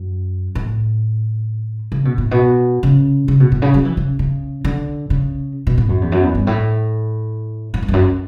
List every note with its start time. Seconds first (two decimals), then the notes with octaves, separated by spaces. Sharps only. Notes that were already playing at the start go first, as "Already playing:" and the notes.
Already playing: F#2
0.55 A2
1.92 C#3
2.05 B2
2.18 A2
2.31 B2
2.83 C#3
3.28 C#3
3.40 B2
3.52 A2
3.62 C#3
3.74 F#3
3.85 E3
3.97 C#3
4.19 C#3
4.65 D3
5.10 C#3
5.67 B2
5.78 A2
5.89 F#2
6.01 E2
6.12 F#2
6.23 E2
6.35 G2
6.47 A2
7.74 A2
7.82 G2
7.88 E2
7.93 F#2